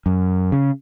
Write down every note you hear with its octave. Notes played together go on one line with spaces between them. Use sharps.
F#2
C#3